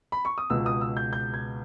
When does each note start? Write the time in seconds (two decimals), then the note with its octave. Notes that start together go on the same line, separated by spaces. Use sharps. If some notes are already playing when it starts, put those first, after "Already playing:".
0.12 B5
0.25 C#6
0.38 D#6
0.50 C#2 B2 G#3 E6
0.66 D#6
0.81 E6
0.97 G6
1.13 G6
1.34 G#6